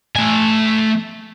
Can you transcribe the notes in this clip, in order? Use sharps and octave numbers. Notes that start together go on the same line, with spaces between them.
A3 G#5